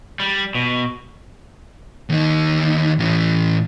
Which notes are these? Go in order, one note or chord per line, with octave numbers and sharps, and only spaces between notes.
G3
B2
D#2 D#4
A2 E3